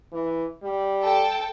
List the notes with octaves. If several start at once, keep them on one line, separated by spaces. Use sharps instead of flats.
E3
G3
A4 G5 A5